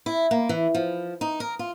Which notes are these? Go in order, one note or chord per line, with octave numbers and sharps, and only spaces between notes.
E4
A#3
E3
F3
D#4
A#4
F4